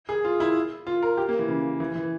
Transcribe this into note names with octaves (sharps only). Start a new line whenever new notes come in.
G#4
F4
E4
F4
A#4
G4
A#3
E3
C#3
E3
E3